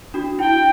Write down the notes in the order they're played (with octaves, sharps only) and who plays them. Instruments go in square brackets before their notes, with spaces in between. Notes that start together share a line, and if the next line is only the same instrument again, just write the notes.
[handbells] D4 F#4
[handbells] E4 [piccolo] G5